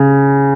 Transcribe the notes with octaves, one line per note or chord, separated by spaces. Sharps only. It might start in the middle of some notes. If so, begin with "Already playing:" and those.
Already playing: C#3